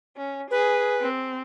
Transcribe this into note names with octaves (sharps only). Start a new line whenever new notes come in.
C#4
G#4 B4
C4